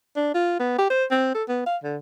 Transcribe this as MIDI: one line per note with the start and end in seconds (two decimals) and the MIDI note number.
0.16 0.32 62
0.35 0.56 65
0.60 0.77 59
0.79 0.86 67
0.90 1.04 72
1.11 1.34 60
1.35 1.43 69
1.49 1.63 59
1.66 1.77 77
1.83 1.97 50